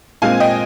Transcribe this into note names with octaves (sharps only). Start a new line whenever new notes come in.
A#2 G#3 C4 F5 G#5
D#5 G5